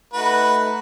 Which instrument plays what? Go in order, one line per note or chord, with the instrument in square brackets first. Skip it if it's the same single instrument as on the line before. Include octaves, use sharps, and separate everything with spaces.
[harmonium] A3 D#4 [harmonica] F#4 B4